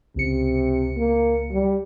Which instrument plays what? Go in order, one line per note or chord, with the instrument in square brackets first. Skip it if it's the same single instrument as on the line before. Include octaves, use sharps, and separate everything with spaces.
[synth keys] C#2 C#7 [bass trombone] C3
[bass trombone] A#3
G3